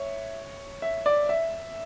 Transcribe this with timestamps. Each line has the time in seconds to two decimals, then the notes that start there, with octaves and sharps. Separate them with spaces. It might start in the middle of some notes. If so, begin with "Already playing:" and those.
Already playing: C#5 E5
0.82 E5
1.06 D5
1.29 E5